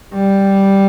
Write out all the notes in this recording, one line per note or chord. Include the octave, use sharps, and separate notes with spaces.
G3